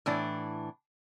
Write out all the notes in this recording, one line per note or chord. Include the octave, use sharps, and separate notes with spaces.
A2 E3 D4